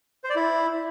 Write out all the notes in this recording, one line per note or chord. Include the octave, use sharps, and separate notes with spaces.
C5
D5
E4